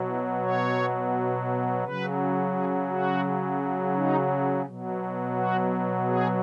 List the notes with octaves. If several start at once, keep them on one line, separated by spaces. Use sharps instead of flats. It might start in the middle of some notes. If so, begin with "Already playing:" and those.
Already playing: B2 F#3
E4
C#5
C#3 F#3 B4
G#4
F#4
D#4
B2 F#3
F#4
G#4